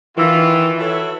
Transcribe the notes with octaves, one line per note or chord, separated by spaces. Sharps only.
D#3 E3 F4
E4 F#4 A4 B4 C#5 E5